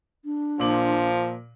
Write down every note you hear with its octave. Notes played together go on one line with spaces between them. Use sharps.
D4
A#2 F3 D6 F#7